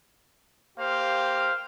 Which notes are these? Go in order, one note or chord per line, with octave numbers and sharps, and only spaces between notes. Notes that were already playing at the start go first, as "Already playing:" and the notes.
A#3 G4 C5 F5